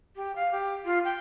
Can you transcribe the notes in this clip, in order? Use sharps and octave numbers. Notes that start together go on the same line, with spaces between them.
G4
F5
G4
F4
G5